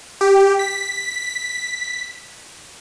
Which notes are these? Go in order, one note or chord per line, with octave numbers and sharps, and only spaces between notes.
G4
B6